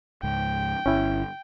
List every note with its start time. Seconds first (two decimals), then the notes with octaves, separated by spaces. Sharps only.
0.23 C#2 G#2 G5
0.86 G1 C#4 E4